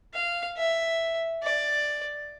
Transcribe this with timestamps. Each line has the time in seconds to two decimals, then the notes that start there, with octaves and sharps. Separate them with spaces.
0.14 F5
0.57 E5
1.43 D5